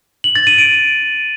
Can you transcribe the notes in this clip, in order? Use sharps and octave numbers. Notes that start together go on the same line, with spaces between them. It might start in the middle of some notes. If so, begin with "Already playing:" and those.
F#7
A6
D#7
D7